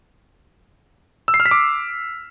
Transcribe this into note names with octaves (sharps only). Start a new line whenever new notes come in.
E6
C7
F6
B6
D6